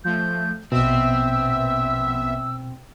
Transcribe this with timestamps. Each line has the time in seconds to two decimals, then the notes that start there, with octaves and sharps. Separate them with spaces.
0.04 F3 A3 G6
0.72 A#1 B2 B3 C4 E5 E6